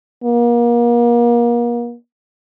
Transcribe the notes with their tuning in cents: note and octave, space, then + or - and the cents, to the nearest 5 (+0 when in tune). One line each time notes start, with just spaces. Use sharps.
A#3 +35